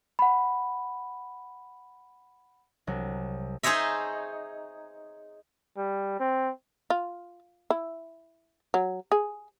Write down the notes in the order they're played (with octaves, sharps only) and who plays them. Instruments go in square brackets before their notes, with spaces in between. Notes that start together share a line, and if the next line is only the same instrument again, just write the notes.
[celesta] F#5 B5
[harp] C2 F#3
[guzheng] D#4 G#4 C5 C#5 D#5 E5
[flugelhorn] G3
C4
[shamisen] F4
E4
F#3
G#4